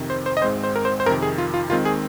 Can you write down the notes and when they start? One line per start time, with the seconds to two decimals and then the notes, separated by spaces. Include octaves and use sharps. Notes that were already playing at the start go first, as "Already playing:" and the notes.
Already playing: F2 C3 D#3
0.10 C5
0.26 C5
0.37 D#5
0.42 G#1 G#2 G#3 C4 C5
0.64 C5
0.76 A#4
0.85 C5
1.00 C5
1.06 F2 C3 D#3 A#4
1.22 G#4
1.38 F4
1.54 F4
1.70 D#2 D#3 G#3 C4 F4
1.85 G#4